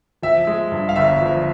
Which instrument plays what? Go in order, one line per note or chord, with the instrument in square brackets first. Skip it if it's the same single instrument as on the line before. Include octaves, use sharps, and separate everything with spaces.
[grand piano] F3 E5
G#3
G2
F5
G1 E5
F3